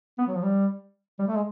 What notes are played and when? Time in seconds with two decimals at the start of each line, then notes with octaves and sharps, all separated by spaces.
0.18 B3
0.27 F#3
0.35 F3
0.43 G3
1.19 G3
1.28 A3
1.36 G#3